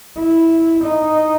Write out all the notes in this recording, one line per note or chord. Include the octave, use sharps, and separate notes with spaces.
E4
D#4